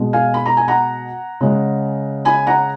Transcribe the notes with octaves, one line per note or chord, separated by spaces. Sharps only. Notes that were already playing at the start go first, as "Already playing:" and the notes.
Already playing: B2 G#3
F5 G#5
B5
A#5
G#5
F#5 A#5
C#3 G#3
G#5 B5
F#5 A#5